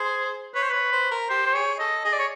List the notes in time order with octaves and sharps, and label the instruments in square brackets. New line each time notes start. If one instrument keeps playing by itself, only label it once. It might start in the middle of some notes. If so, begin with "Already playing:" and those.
Already playing: [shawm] G#4 [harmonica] C5
[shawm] B4 [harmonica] C#5
[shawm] C5
[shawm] B4 [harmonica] C#5
[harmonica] C5
A#4
[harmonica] G4 [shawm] C5
[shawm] C5
[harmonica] G#4 [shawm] C#5
[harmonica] A4 [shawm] D#5
[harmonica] G#4 [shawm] D#5
[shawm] D5
C#5